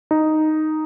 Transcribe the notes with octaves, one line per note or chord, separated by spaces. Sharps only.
D#4